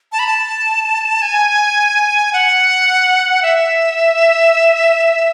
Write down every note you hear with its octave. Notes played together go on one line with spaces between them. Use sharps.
A5
B5
A5
G#5
F#5
E5